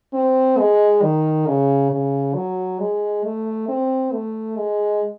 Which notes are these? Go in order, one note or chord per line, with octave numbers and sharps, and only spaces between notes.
C4
G#3
D#3
C#3
C#3
F#3
G#3
A3
C4
A3
G#3